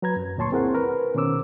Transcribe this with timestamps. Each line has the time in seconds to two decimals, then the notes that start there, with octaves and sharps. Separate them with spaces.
0.02 F#3 B4 A#5 G#6
0.16 F#2
0.37 D2 A#2 C#5 A5 C6 C#6
0.52 C4 E4 G#4 A#4 C5 F#5
0.75 A#4 B4
1.15 B2 D#3 C#4 C5 D6 E6